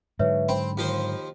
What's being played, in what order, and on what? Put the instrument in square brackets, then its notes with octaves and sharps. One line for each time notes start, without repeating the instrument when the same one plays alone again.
[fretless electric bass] G#2 D3 F#3 [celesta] B4 C#5 E5
[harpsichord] C4 [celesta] B5
[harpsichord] D#2 F3 C5